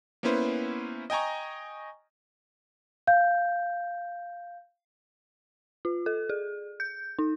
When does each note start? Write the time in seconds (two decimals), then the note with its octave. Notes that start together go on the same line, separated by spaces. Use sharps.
0.23 A#3 B3 C#4 E4 B4 C5
1.10 D#5 G5 G#5 A#5 C#6
3.07 F5 G6
5.85 F4
6.06 A4
6.30 G#4
6.80 G6
7.19 D#4